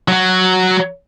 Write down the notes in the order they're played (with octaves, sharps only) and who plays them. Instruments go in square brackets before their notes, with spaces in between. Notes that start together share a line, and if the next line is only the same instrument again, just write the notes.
[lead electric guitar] F#3 F#4